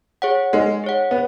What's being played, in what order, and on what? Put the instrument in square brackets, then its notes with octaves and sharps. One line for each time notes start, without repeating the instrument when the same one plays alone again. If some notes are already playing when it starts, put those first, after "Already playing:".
[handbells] G#4 C#5 F#5
[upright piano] G#3 [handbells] D#4
[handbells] G#4 C#5 F#5
[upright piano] B3